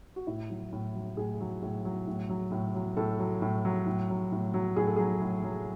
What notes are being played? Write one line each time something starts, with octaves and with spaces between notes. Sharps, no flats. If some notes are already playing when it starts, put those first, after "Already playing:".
F#4
A2 E4
F#3
A2
F#3
A2 G#4
F#3
A2
F#3
A2
F#3
A2
F#3
A2 A4
F#3
A2
F#3
A2
F#3
A2
F#3
A2 G#4
A4
F#3 G#4
A2
F#3